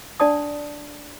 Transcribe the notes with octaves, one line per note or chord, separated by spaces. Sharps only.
D4 D5 A5 D#6